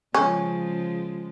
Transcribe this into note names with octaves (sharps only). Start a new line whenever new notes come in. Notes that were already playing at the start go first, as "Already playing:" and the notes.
C#3 F3 G#3 C#4